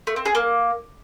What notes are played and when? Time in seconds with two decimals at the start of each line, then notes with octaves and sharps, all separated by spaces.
0.07 A3
0.16 C4
0.26 G#4
0.35 A#3